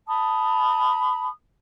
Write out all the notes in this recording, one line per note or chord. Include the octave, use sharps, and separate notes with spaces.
A5 B5 D#6